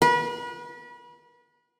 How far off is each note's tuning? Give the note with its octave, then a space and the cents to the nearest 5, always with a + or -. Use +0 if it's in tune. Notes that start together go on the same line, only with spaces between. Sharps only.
B4 -35